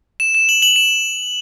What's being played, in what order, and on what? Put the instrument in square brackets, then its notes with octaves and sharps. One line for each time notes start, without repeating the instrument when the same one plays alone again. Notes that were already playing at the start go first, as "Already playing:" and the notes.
[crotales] E7
E7
F#7
F#7
E7